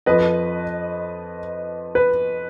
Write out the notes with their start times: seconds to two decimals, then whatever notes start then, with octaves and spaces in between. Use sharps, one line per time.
0.06 F2 F3 B4 D#5
1.95 B4